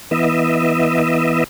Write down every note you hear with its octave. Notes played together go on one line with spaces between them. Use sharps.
E3 B3 D#5 E5